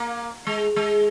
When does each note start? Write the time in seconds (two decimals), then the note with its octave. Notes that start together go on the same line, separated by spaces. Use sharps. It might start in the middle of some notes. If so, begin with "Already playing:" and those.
Already playing: A#3
0.47 G#3
0.76 G#3